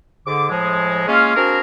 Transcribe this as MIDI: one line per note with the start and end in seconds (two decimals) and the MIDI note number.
0.27 0.49 44
0.27 0.49 50
0.27 0.49 86
0.50 1.06 45
0.50 1.06 53
0.50 1.06 56
1.07 1.33 56
1.07 1.33 58
1.07 1.33 61
1.07 1.33 65
1.35 1.60 58
1.35 1.60 60
1.35 1.60 62
1.35 1.60 66
1.35 1.60 68
1.35 1.60 70